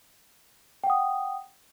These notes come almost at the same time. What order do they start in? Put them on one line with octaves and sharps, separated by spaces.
G5 F#5 D#6